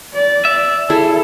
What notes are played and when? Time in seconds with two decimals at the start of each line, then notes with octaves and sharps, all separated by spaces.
0.13 D5
0.45 E5
0.90 E4 G#4 A4